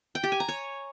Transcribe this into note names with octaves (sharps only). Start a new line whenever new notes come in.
G5
G4
G#5
A#5
C#5